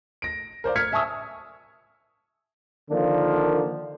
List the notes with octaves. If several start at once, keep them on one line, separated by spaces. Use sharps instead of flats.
A#6 D7
A#4 C5 D5 F5
F6 G#6 B6 C#7
E5 G#5 A5 C#6 D#6 E6
D3 D#3 F3 A#3 D4